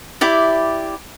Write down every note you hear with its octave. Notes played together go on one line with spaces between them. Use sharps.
E4 G4 D5 E5